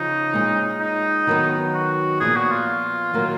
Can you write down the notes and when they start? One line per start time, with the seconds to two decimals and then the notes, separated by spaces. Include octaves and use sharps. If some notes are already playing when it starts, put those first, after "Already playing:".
Already playing: C#3 F3 C#4 D#4
0.34 A#2 G#3 C#4
0.81 D#4
1.27 D#3 F#3 B3
1.74 F#4
2.20 A#2 F3 B3 G#4
2.36 F#4
2.52 F4
3.14 D#3 F#3 A#3